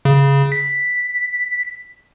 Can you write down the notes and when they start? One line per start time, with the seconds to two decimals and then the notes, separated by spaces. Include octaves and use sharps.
0.05 C#3
0.52 B6